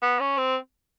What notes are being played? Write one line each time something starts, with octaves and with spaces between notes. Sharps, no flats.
B3
C#4
C4